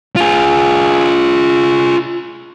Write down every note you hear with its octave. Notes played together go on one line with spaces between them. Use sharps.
F4 G#4